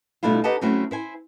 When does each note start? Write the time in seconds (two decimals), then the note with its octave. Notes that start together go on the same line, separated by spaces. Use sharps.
0.23 B2 G3 A3 D4 E4 F4
0.44 D#4 G4 B4 D#5 F#5 A5
0.61 F#3 A3 C4 C#4 E4 F#4
0.91 E4 C5 G#5